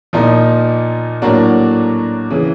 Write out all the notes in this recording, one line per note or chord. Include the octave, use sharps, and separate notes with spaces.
A#2 F3 A#3 D#4
A2 F#3 A#3 D4 F#4
C#3 E3